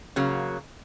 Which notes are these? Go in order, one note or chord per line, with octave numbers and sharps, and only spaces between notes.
C#3 F#3 A#3